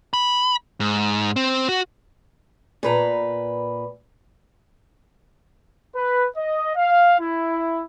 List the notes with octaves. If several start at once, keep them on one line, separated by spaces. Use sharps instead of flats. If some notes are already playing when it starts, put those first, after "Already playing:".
B5
G#2
C4
F#4
A#2 B4 A#5
B4
D#5
F5
E4